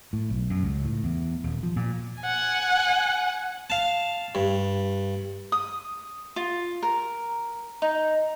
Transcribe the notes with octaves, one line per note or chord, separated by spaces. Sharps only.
A2
B1
F#2
C#2
A2
E2
D#1
F3
A#2
F#5 G#5
F5 A5
G2
D#6
F4
A#4
D#4